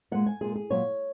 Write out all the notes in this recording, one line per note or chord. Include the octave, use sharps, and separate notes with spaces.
A#2 G#3 F#5
G#5
A#2 G#3 G#4
G#4
A#2 F#3 C#5